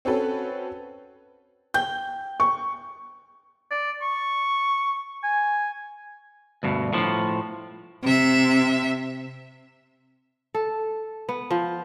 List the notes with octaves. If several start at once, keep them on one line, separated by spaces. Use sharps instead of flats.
C4 C#4 F#4 A4 B4
G5 G6
C#6
D5
C#6
G#5
D2 G2 B2
A2 F3
C3 E5
A4
B3
F3